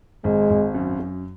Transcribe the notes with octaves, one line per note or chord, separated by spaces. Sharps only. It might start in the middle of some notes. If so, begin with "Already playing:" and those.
G#1 G#3
G#1
F#2
F#2